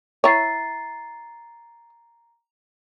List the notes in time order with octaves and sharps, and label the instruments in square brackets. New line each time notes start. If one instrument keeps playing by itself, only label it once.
[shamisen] E4 C#5 [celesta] A#5 A6 C7